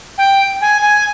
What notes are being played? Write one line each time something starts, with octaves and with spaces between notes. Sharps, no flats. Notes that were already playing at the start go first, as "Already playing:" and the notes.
G5
G#5
G#5